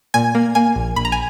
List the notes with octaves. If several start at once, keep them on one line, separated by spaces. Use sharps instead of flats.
A#2 G#5
A#3
A#3 G#5
A#1
A#1 B5
A#5
G#5